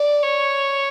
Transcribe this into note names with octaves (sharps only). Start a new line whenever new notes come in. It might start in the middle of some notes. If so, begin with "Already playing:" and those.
Already playing: D5
C#5